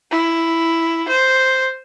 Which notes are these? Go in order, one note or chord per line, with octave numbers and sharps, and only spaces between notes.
E4
C5